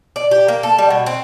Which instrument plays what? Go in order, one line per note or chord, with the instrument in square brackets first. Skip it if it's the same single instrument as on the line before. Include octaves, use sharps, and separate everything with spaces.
[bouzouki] D5
G4
A#3
A4
G3
B2
C4